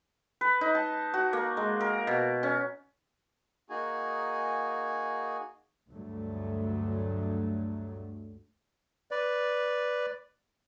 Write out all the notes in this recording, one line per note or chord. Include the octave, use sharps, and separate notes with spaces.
B4
D#4
A5
F#4
A#3
G#3
A#4
B2
C#4
A#3 D#4 F#4 G#4 G#5
D2 G2 D3 F#3 A3
B4 D5